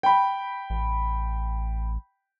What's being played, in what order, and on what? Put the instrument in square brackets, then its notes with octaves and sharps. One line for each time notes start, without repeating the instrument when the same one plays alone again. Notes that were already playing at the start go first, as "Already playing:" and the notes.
[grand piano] G5 B5
[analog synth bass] A1